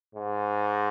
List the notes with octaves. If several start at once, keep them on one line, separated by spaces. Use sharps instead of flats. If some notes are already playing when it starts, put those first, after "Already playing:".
G#2